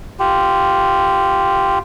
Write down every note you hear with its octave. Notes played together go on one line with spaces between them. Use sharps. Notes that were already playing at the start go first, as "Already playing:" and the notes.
F4 G4